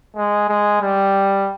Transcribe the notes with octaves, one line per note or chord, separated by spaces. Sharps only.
G#3
G#3
G3